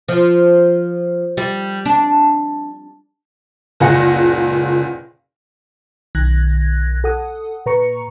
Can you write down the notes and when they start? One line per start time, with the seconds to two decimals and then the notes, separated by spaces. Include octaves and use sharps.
0.08 F3
1.37 G3
1.85 D4
3.80 F#1 C#2 A#2 F#5 A#6
6.15 B1 D#3 F#6 G#6 A#6
7.04 A4 F#5 D#6
7.66 A#2 B4 A#5 C#6 C#7